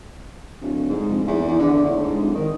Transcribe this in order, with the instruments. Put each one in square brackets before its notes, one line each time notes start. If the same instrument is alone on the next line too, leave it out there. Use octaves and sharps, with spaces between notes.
[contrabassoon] D1
G#2
F1
E2
E2
D3
A2
G#2
D1
D#3